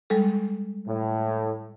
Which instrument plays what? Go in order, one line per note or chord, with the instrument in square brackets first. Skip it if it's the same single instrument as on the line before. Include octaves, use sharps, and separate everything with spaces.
[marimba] G3 G#3 A4
[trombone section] A2